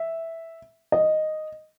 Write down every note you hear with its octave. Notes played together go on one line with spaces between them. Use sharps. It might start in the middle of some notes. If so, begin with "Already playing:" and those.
Already playing: E5
D#5